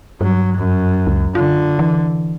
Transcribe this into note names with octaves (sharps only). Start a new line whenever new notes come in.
G2 F#3
F#2
C#2
D3 F4
E3